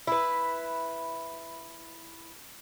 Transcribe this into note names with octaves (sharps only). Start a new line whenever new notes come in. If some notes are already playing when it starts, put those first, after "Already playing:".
E4 B4